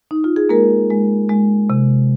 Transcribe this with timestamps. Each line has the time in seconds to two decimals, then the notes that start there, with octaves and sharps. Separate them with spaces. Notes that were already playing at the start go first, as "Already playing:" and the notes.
0.11 D#4
0.24 F4
0.36 G#4
0.49 G#3 A#3 A#4
0.90 G#3
1.30 G#3
1.70 C3